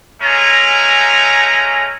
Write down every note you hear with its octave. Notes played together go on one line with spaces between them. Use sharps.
G#3 A3 C#4 G#5 A#5